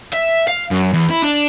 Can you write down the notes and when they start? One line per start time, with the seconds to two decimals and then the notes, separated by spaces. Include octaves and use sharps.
0.13 E5
0.48 F5
0.71 F#2
0.94 E2
1.10 E4
1.22 D4